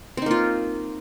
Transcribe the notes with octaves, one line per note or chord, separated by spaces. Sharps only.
A#3 C4 D#4 F4